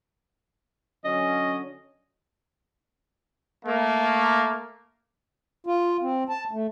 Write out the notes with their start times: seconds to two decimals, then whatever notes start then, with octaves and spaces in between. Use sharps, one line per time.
1.05 D3 F#3 C#4 D#5
3.66 A3 A#3
5.66 F4
6.02 C4
6.29 A5
6.51 A3